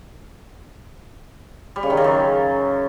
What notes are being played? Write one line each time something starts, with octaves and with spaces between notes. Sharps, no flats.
G3
C#3
D#3
C#3
F#2